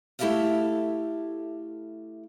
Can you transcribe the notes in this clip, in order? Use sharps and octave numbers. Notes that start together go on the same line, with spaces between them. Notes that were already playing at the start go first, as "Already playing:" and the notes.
A3 E4 G4 A4 E5 F5